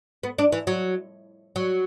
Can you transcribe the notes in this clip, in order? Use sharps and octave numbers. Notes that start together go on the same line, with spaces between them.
B3
D4
E3
F#3
F#3